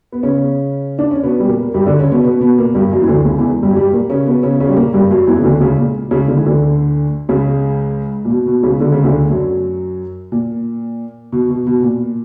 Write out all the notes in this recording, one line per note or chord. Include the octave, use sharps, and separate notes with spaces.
B3
C#3 C#4
D4
C#4
B2 B3
G3
A#2 A#3
G2 G3
D3 D4
C#3 C#4
B2 B3
B2 B3
B2 B3
A#2 A#3
G2 G3
F#2 F#3
E3
D2 D3
C#2 C#3
E2 E3
G2 G3
F#3
G2 G3
A#2 A#3
C#3 C#4
B2 B3
C#3 C#4
C#3 C#4
G3
A#2 A#3
G2 G3
F#2 F#3
E2 E3
C#3
D2 D3
C#2 C#3
A#2
C#2 C#3
D3
E3
D2 D3
C#2 C#3
A#2
B2
B2
C#2 C#3
D3
C#3
D2 D3
F#2 F#3
A#2
B2
B2
B2
A#2